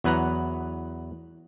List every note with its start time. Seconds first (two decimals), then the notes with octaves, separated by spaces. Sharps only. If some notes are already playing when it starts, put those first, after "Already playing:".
0.04 E2 F#3 B4 F#5 A#5